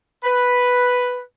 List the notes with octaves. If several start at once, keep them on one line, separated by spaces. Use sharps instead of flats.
B4